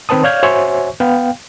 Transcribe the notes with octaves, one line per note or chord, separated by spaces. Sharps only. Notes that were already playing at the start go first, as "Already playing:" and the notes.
D#3 C4 B4 C5 A5 D#6
C#5 D5 F5 F6 G6 G#6
F#4 C5 C#5 E5 G#5 C#6
B3 F5 G5